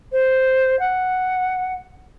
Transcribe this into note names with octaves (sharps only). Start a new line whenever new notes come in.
C5
F#5